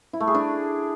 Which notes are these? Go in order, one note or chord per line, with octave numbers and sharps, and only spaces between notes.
E4
A3
G#4
D4